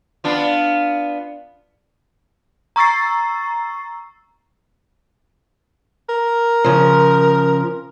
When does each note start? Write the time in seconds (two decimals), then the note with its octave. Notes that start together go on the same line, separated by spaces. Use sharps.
0.24 B3 D4 F4
2.76 A#5 C#6 E6 A6 C7
6.09 A#4
6.64 C#3 F3